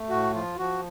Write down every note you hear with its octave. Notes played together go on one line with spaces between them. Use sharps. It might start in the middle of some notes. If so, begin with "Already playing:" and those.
Already playing: A3
A2 F#4
F3 F4
F3 F#4